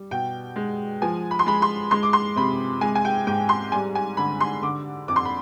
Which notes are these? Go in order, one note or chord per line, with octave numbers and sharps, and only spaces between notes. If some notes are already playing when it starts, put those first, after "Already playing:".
Already playing: G3
B2 G5
G#3
F3 G#5
B5
C6
G#3 B5
C6
G#3 C6
D6
C6
C3 B5
G#3 G#5
G#5
G5
G#2 G5
C6
G3 G#5
G#5
D3 B5
C6
D3 D6
F2 D6
C6
B5